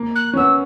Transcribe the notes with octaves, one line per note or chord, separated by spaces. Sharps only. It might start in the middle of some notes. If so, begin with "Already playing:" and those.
Already playing: A#3
F#6
C#4
B3 E6